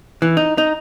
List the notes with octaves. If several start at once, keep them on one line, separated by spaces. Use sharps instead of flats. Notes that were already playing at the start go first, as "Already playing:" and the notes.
E3
D#4
D#4